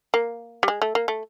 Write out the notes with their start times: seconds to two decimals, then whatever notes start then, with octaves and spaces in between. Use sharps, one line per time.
0.14 A#3
0.63 G3
0.68 G#3
0.82 A3
0.95 A#3
1.08 A3